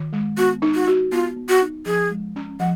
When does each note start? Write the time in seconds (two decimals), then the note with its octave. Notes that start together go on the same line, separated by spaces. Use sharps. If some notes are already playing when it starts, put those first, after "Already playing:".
Already playing: D#3
0.13 G#3
0.37 B3 F#4
0.62 D#4
0.75 F#4
0.87 F#4
1.12 B3 F4
1.36 B3
1.49 F#4
1.61 D#4
1.86 F3 G#4
2.11 G#3
2.36 C#4
2.60 F3 F#5